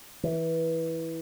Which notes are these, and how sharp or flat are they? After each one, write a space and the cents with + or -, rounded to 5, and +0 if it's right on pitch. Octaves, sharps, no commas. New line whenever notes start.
E3 -15